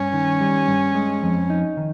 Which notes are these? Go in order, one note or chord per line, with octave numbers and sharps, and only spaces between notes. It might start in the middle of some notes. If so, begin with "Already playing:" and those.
Already playing: G2 C#4
D#3
G3
G2
G#3
F2
D#4
D#3